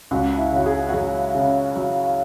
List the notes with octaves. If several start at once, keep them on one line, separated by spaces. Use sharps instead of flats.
C#2 F#4
E4
C#3 F#4
G#4
F#4
F#3 G#4
C#3
F#3